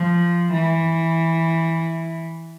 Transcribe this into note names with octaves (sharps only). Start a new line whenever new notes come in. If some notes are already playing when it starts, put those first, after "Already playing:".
Already playing: F3
E3